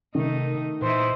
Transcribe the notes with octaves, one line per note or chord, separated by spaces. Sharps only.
C3 D#3 A3 D#4
A#2 E3 D#4 E4 C5